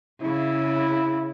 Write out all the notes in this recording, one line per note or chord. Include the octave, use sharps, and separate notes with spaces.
C#3 E4